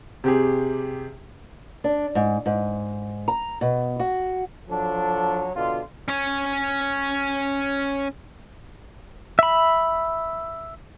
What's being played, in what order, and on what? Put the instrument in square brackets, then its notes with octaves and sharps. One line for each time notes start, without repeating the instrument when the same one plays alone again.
[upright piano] C3 G4 G#4
[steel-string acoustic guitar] D4
G#2
G#2
A#5
B2
F#4
[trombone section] F3 F#3 D4 A4
B2 D3 F4
[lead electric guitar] C#4 C#5
[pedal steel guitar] E5 B5